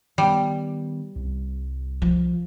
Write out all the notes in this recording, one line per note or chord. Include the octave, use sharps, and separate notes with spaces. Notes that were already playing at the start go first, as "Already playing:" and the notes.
D#3 G3 B3
C2
F3